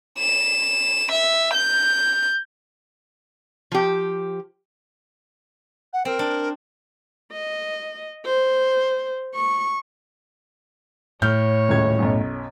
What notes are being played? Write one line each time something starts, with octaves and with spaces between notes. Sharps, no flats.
E7
E5
G6
F3 G4
F#5
C4 A#4
D4
D#5
C5
C#6
A2 C#5 F6 G6
D#1 C#2 G#6
B1 F#2